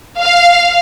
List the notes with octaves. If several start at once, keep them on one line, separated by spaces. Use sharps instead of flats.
F5